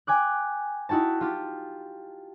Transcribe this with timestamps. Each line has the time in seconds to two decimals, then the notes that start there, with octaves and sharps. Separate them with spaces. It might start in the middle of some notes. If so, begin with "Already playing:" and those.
0.07 G5 G#5 D6 F#6
0.89 D#4 E4 F#4 G5 A5
1.21 F4 G4